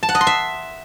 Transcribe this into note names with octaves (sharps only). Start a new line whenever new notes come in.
A5
F#5
D#5
C6
E5